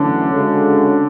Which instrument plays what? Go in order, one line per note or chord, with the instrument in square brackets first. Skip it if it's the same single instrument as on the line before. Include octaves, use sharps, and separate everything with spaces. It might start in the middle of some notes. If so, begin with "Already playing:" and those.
Already playing: [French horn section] F#2 E3 A3 C#4 [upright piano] D3
[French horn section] C#3 G#3 C#4 F#4 A4